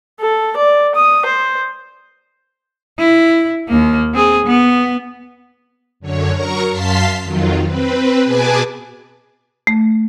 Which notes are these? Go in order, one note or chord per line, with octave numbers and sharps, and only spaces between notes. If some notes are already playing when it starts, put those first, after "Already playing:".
A4
D5
D#6
C5
E4
D#2 A#3
C4 G#4
B3
F#2 D3 C#5
F#3 A#4 A#5 C#6
F#2 F5 A5 C6 B6 C7
F2 D#3 F#3 F4
C4 B4
B2 G#4 B4 G#5 A5 D6
A3